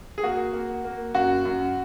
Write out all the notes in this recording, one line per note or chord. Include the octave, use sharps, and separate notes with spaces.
G#4
A#3 F#4
A#3
A#3
F#2 F#4
F#2